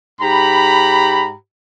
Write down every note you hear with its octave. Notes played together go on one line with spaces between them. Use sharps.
G#2 G4 A#5 B5